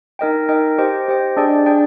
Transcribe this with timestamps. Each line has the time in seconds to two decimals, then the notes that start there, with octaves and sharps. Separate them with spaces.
0.19 D#4 A#4 D#5 G5
0.49 D#4 A#4 D#5 G5
0.78 G4 C5 D#5 G5
1.08 G4 C5 D#5 G5
1.37 D4 G#4 D5 G5
1.66 D4 G#4 D5 G5